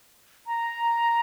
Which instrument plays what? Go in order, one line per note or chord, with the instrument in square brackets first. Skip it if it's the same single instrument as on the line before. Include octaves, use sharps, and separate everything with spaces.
[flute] A#5